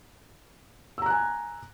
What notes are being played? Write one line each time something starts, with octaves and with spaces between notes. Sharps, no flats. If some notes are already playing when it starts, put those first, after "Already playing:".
G#5 A#5 E6 F#6